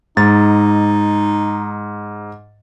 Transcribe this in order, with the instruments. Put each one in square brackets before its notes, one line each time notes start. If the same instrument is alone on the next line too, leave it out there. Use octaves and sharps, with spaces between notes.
[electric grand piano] G#2 A6 [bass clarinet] D#4